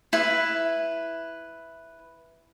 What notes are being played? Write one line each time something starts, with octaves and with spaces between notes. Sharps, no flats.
E4 B4